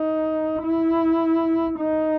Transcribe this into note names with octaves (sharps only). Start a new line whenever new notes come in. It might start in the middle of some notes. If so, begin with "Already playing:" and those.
Already playing: D#4
E4
D#4